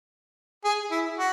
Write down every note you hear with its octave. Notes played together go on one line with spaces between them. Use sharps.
G#4
E4
F#4